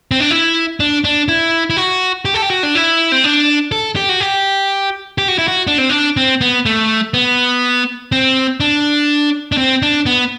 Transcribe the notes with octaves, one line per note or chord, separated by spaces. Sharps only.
C4
D4
E4
D4
D4
E4
E4
F#4
G4
A4
G4
F#4
D4
E4
C4
D4
A4
G4
F#4
G4
G4
F#4
E4
F#4
D4
C4
D4
C4
B3
A3
B3
C4
D4
D4
C4
D4
B3